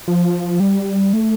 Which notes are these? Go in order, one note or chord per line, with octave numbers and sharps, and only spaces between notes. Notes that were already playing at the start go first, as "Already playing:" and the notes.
F3
G3
A3